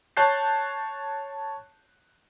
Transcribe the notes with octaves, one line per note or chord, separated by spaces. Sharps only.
C#5 A5 F#6 G6 C7